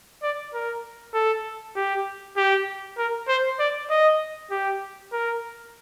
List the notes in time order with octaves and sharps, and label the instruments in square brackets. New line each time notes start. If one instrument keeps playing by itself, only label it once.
[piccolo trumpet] D5
A#4
A4
G4
G4
A#4
C5
D5
D#5
G4
A#4